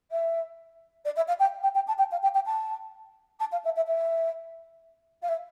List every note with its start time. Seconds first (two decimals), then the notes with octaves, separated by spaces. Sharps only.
0.11 E5
1.05 D5
1.16 E5
1.27 F5
1.39 G5
1.63 G5
1.74 G5
1.87 A5
1.98 G5
2.11 F5
2.22 G5
2.34 G5
2.45 A5
3.39 A5
3.51 F5
3.64 E5
3.76 E5
3.87 E5
5.22 F5
5.28 E5